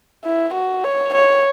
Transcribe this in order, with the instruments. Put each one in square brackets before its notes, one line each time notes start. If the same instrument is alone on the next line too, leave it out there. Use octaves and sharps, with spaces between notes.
[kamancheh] E4
F#4
C#5
C#5